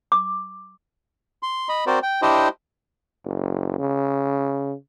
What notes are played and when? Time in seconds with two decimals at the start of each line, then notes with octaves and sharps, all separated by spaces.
0.12 D6
1.43 C6
1.69 D#5 B5
1.87 C4 F#4 A#4 C5 D5
2.03 G5
2.22 D4 E4 G4 C5 D#5
3.25 F#1
3.79 C#3